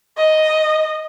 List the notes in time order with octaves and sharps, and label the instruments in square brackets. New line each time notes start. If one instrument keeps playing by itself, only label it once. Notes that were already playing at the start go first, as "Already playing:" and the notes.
[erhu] D#5